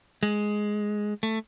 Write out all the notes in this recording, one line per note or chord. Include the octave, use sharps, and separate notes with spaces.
G#3
A3